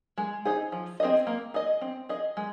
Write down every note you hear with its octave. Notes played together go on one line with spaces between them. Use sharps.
G#3
D#4 G#4 C5
F3
C4 G#4 D#5
A#3
G#4 D#5
C4
G#4 D#5
G#3